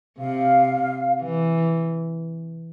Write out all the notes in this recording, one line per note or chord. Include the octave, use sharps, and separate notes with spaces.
C3 F5
E3